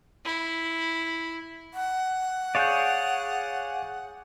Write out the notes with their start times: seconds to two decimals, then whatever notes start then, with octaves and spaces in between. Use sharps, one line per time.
0.25 E4
1.74 F#5
2.55 G#4 C#5 D5 F5 F#6 G6